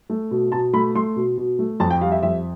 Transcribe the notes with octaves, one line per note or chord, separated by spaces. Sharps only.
A3
B2
B2 A5
A3 B5
A3 C6
B2
B2
A3
F2 A5
G5
G3 F5
E5
F2 E5